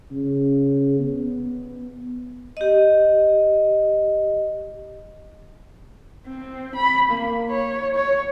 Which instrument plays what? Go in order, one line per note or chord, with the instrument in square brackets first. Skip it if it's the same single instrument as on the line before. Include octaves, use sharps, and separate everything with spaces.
[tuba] C#3
B3
[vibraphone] G4 D#5
[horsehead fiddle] C4
B5
A#3
C#5
C#5